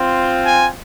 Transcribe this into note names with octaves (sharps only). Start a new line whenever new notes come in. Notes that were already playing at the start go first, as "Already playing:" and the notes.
Already playing: C4 F4
G#5